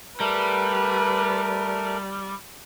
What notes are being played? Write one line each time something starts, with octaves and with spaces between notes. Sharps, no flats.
G3 A3 A#4 B4